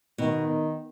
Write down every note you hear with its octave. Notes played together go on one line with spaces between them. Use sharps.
B2 D#3